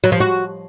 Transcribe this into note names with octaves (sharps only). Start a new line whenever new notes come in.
F#3
F3
F#4